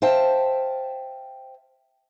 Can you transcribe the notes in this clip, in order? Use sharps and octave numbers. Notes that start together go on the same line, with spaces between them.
C5 E5 F5 G5 A5